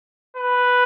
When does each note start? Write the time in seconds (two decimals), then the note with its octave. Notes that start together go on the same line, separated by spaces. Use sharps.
0.37 B4